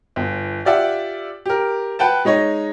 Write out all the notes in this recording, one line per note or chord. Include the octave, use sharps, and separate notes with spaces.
G1
F4 G4 D5 E5 F#5
G4 A#4
B4 F#5 G5 A5
G#3 D#4 C#5 D#5